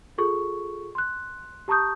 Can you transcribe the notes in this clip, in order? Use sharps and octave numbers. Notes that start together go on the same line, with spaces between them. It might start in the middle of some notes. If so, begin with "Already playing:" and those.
F4 G#4 A4 C#6
C6 F#6
G4 A5 A#5 C#6 D#6 G6